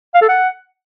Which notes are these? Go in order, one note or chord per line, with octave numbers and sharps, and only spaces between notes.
F5
A4
F#5